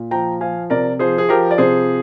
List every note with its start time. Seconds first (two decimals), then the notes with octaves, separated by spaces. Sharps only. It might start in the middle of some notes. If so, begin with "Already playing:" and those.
Already playing: A#2
0.11 F3 G5 A#5
0.41 F3 F5 G#5
0.70 C3 A#4 D5
0.99 F3 G#4 C5
1.18 G#4
1.29 F3 G4 A#4
1.51 D5
1.58 C3 G#4 C5